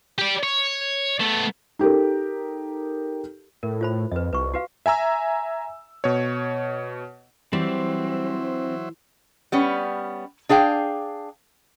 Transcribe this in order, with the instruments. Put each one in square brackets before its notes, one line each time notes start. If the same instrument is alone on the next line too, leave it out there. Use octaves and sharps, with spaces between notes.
[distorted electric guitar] G4 D5
C#5
A3 B3
[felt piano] D#4 G4 A4 A#4
[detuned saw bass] A2 [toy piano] A#4
[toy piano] F4 C5 B5
[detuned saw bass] F2 [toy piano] B4 D#5
[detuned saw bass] C2 [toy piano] B4 C#6
[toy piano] F#4 B4 F5
[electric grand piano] E5 G#5 A#5 E6
B2 C#5
[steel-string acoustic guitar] E3 [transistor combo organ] F#3 C5 E5 [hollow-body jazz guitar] G3 [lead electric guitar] C4
[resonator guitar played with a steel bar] G3 B3 C#4
D4 G#4 F5 G5